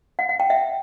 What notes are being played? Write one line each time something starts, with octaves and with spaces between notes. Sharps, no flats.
F#5
F#5
G5
E5